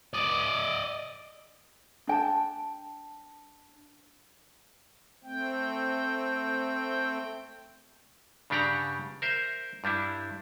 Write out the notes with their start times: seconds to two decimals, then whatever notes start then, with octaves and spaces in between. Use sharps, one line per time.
0.14 D5 D#5
2.07 D4 G5 A5
5.24 A3 C4 G5
8.50 G2 C#3 D4 G4 F#5 A#5
9.22 A#4 C5 E5
9.84 G2 G3 D4 E4